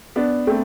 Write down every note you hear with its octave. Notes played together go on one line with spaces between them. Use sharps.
B3 D4
A3 C4